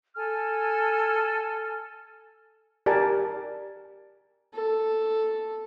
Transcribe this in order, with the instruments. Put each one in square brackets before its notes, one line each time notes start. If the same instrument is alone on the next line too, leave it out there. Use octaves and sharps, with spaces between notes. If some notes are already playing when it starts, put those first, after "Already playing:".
[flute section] A4 G#5 F6
[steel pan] G4 A#4 D5 G#5 A5
[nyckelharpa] A4